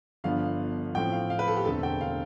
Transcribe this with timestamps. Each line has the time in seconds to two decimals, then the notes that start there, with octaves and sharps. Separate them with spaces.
0.24 G1 G2 F3 B3 D4 F5
0.94 A1 A2 F3 C4 G5
1.13 F5
1.30 F5
1.39 B4
1.48 A4
1.57 G4
1.65 E1 D2 D3 A3 C4 A4
1.83 G5
2.01 F5